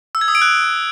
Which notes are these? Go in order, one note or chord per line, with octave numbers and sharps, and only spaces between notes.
E6
G#6
D#6
D7
F#6